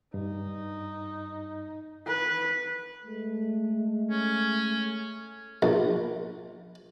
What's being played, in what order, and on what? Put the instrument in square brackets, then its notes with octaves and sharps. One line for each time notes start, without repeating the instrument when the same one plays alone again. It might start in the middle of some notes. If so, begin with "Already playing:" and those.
[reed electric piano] G2 [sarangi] D#4
[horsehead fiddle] B4
[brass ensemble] G#3 A3
[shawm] C#4
[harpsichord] A#1